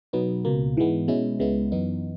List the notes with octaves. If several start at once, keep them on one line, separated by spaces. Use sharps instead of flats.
B2 F#3 B3 D#4
C#2 B2 A#3
G#2 E3 G#3 B3
B2 G#3 C#4 E4
C#2 C#3 G#3 B3 E4
F#2 E3 B3 D#4